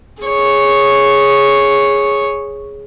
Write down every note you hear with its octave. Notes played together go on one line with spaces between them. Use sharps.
G#4 C#5